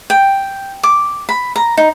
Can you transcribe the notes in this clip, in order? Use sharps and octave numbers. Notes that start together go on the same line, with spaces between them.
G5
D6
B5
A#5
D#4